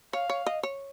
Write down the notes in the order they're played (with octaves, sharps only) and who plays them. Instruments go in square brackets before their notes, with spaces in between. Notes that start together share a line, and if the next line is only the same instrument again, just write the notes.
[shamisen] C#5 [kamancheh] F5
[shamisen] C#5
D#5
C#5